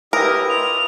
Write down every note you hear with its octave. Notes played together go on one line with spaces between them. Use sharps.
E4 G4 A#4 B4 D#5 D#6
F4 D#5 F7